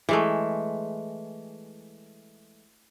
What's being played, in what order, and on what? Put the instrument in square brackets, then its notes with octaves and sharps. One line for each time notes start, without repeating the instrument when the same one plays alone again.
[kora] E3 G#3 A3